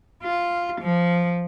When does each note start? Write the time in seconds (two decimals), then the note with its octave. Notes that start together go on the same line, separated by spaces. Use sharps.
0.23 F4
0.81 F3